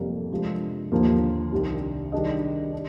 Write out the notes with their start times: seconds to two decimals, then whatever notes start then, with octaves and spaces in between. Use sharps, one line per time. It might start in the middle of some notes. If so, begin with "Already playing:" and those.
Already playing: F1 F2 C3 G3 A#3
0.31 C3 F3 G#3 D4
0.92 D#2 D3 F3 A#3
1.52 C2 C3 D#3 G3 D4
2.12 D#3 G3 D4 G#4 D#5
2.73 D4